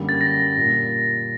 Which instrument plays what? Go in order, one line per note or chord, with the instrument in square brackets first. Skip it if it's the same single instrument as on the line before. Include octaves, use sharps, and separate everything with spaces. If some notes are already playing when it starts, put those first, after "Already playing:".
Already playing: [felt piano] F#2 D3 G3 A#3
[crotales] A6
A#6
[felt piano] A#2 G3 A#3